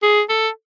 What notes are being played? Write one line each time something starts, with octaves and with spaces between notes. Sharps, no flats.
G#4
A4